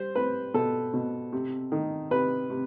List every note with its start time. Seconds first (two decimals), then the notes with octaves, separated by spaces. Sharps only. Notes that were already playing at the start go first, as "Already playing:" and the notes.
Already playing: G3 C5
0.15 C4 B4
0.54 B2 A4
0.94 B2
1.33 C3
1.72 D#3
2.11 C3 B4
2.50 C3